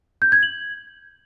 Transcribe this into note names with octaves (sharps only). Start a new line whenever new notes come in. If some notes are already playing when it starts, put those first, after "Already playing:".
G6
G#6
F#7